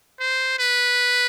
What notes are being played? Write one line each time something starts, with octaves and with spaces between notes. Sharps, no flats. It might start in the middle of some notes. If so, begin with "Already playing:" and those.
C5
B4